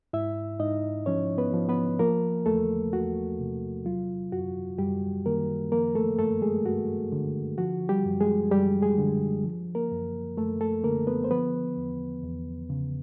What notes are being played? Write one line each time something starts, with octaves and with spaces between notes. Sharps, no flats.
G#2 E4 E5
G#2 D#4 D#5
F3 C#4 C#5
B3 B4
F3
B3 B4
F3 A#3 A#4
E2 A3 A4
E2 F#4
C3
F#3 F4
F#2 F#4
F#2 G3 G4
D#3 A#3 A#4
F3 A#3 A#4
A3 A4
G2 A3 A4
G#3 G#4
G2 F#4
D3
F3 F#4
G3 G4
F#2
G#3 G#4
F#2 G3 G4
G#3 G#4
D3
F3
A#3 A#4
F#2
F#2 A3 A4
A3 A4
D3 A#3 A#4
B3 B4
C5
F3 B3 B4
E2
E2
C#3